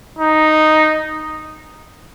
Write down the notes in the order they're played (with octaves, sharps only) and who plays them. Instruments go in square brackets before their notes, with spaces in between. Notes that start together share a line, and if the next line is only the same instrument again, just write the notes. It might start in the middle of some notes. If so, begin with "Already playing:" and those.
[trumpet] D#4